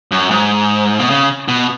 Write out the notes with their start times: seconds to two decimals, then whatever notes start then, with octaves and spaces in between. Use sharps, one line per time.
0.11 F#2
0.31 G#2
1.00 B2
1.10 C#3
1.48 B2